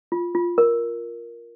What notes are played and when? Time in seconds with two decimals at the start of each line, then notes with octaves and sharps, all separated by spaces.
0.12 F4
0.35 F4
0.58 A#4